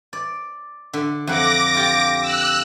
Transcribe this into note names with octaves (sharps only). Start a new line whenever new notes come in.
D5
D3
F2 F#5 D6 A#6
F4 G4
E6 F#6